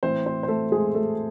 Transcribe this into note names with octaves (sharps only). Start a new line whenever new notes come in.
A2 E3 C4 C5
C4 C5
C5
A3 A4
G#3 G#4
A3 A4